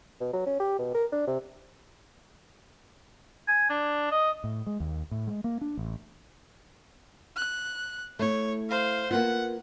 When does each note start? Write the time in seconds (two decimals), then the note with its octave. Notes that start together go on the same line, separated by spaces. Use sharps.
0.21 B2
0.33 F#3
0.46 C#4
0.60 G4
0.79 B2
0.95 A#4
1.12 D4
1.27 C3
3.48 G#5
3.70 D4
4.11 D#5
4.44 A2
4.67 G#3
4.80 D#2
5.11 A2
5.27 G#3
5.44 A#3
5.61 D4
5.78 A1
7.36 F#6
8.19 A3 E4 C#5
8.69 C5 F5
9.11 A#3 B3 F4 F#5